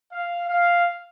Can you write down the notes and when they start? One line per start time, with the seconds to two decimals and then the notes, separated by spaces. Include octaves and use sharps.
0.12 F5
0.48 F5